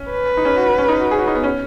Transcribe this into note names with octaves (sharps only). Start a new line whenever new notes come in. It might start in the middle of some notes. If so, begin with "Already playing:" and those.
Already playing: C#4
B4
D#4
C#4
F#4
F#4
C#4
D#4
F#4
G#4
F#4
D#4
B3
C#4